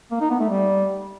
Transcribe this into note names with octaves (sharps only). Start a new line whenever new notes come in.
A#3
D#4
B3
A3
G3